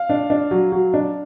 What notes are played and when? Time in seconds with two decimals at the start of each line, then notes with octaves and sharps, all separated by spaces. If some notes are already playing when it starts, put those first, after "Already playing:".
Already playing: F5
0.09 D4
0.30 D4
0.51 F#3
0.72 F#3
0.94 D4